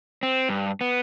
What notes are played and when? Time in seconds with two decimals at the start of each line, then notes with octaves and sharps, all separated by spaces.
0.23 C4
0.49 G2
0.81 B3